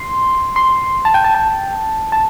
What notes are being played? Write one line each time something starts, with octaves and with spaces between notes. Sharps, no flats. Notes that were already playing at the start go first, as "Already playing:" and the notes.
Already playing: C6
C6
A5
G5
A5
A5
A5